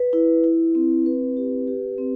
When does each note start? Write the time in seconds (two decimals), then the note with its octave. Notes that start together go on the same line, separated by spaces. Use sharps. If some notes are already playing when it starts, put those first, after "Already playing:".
Already playing: B4
0.13 E4
0.44 E4
0.75 C4
1.06 B4
1.37 G4
1.68 G4
1.98 C4